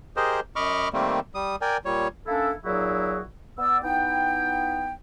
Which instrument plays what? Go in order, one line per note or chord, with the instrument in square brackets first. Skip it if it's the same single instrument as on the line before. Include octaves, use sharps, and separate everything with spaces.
[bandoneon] G4 G#4 A#4 C5 D#5
F#2 D#5 B5 C#6 D6 F6
D#3 G3 A3 A#3 C4
G3 D#6
A#4 D5 G5 G#5
A#2 G3 C#5
[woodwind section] A#3 C#4 D4 E4 A4
A#2 F#3 D#4 E4 F#4 G#4
B3 D5 E6
B3 D#4 E4 G5